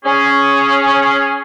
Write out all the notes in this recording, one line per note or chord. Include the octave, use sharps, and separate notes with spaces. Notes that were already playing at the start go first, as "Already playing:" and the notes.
C#4 G#4